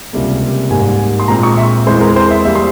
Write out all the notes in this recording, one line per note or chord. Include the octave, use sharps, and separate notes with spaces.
C#2 C3 G3 A#3
G#2 G3 A#3 G#5
C6
A#2 G#3 C4 A#5
C#6
E5
E2 E3 G#3 C4 C5
A#4
C5
E5
G3 A#3 E5
C6